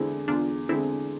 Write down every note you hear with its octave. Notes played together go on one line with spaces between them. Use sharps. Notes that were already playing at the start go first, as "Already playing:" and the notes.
Already playing: E2 D3 G#3 C4 E4
E2 D4 F4
D3 G#3 C4 E4